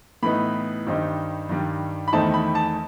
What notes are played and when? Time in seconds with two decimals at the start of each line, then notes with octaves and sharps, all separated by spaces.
0.23 A2 E3 B3 D#4 B5
0.87 G2 D#3 G3 C4 D#4
1.49 G2 D#3 G3
2.08 B5
2.13 E2 D#3 A3 C4 D#4 A5
2.34 B5
2.55 A5